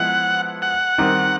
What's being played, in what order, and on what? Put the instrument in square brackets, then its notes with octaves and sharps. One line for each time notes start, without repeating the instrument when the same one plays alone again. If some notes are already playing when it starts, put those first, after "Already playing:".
Already playing: [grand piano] F3 G#3 B3 E4 [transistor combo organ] F#5
[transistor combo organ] F#5
[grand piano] D#3 G3 C4 D#4